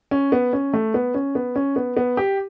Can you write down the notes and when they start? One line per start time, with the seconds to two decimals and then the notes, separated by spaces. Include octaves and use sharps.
0.11 C#4
0.32 B3
0.53 C#4
0.73 A3
0.94 B3
1.14 C#4
1.35 B3
1.56 C#4
1.76 B3
1.97 B3
2.17 G4